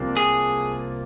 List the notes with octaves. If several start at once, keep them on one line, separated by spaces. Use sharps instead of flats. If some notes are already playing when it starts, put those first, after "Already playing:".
Already playing: C2 C3 F3 A#3 D4
G#4